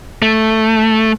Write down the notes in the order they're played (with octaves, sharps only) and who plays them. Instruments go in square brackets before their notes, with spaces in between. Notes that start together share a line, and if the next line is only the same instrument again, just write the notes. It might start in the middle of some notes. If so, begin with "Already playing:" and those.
[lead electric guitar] A3